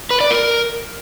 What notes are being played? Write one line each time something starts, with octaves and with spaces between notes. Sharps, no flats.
B4
D5
A#4